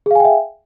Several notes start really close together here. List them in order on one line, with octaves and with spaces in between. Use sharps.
G#4 F5 G#5 G5 E5